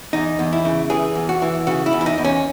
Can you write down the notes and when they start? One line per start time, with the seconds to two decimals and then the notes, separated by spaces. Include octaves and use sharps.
0.13 E2 D#4
0.39 E2
0.53 E4
0.65 C#3
0.90 E3 G#4
1.15 E2
1.29 F#4
1.42 E3
1.67 C#3 F#4
1.86 E4
1.93 E2
2.01 E4
2.06 D#4
2.18 E2
2.25 C#4